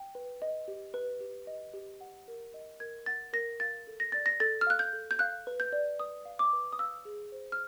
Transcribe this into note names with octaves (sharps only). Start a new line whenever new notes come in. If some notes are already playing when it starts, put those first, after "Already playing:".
Already playing: G5
B4
D#5
G4
B4
G4
D#5
G4
F#5
A#4
D#5
A#4 G#6
F#5 A6
A#4 A#6
F5 A6
A4
A#6
D5 A6
A#6
A4 A6
F6
F5 F#6
G6
A4
G6
F5 F#6
B4
G6
D5
B4 D#6
F5
D6
B4
D#6
F5 E6
G#4
C5
F6